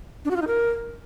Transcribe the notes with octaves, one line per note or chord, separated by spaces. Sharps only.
D4
F#4
F4
D#4
A#4